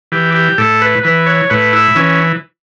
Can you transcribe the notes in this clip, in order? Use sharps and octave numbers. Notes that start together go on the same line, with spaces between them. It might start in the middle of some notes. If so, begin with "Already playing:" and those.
E3 G4
G4
A2 A4
B4
E3 B4
C#5
A2 B4
E4
E3 C#4